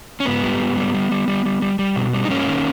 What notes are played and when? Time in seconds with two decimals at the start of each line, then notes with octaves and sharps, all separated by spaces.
0.20 C#4
0.26 G#2 B3
0.43 G3
0.60 G#2
0.77 G3
0.94 G3
1.11 G3
1.28 G3
1.45 G3
1.62 G3
1.79 G3
1.96 B2
2.13 G3
2.25 D#4
2.30 G#2 A#3 C#4
2.48 D#3